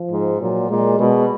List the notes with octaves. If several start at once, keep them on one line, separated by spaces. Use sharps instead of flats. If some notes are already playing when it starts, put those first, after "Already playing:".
Already playing: F3
G#2
A#2 F#3
A#2 G#3
B2 G#3